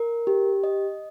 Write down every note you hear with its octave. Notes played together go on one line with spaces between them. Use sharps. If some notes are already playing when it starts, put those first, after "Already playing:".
Already playing: A#4
G4
D#5